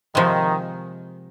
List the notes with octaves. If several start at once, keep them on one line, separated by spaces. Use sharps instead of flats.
C3 D#3 F3 G#3